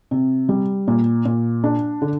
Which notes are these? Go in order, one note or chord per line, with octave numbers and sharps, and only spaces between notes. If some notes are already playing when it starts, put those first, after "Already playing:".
C3
G3
A#2
A#2
D4
D3